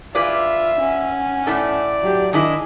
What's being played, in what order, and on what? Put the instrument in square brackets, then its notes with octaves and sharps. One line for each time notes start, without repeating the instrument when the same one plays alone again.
[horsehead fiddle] F4 [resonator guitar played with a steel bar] G#4 B4 D5 [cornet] E5
[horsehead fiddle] C#4 F#5
[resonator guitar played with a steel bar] A2 A3 A4 [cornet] D5
[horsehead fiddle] F#3 G4
[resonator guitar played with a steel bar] D#3 D4 E4 [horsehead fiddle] G#4 [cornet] D#5